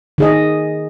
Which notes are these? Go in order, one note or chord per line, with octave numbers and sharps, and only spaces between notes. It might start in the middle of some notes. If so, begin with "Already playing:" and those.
D#3 G#4 D#5